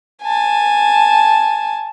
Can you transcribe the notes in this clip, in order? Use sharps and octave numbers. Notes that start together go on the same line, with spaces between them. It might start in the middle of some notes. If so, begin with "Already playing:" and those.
G#5 A5